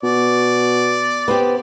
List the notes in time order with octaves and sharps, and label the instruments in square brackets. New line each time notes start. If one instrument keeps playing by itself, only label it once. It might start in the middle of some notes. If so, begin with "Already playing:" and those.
[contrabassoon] B2 [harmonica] D5
[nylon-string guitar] B3 C4 G4